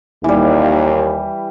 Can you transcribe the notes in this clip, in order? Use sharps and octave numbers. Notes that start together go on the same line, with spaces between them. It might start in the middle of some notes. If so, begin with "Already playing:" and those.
D#2 E3 G3